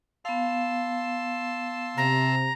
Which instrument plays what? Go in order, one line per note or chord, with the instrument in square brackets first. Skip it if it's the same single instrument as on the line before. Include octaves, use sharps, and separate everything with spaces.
[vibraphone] B3 F5 [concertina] A5 C6 E6
[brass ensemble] C3 [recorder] A#5